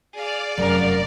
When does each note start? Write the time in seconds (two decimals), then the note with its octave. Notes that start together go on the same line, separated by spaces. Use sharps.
0.13 G#4 D5 F5
0.58 F1 F#2 A#4 F5